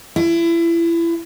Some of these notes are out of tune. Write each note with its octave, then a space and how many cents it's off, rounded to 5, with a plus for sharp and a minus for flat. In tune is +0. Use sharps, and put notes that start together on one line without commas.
E4 +30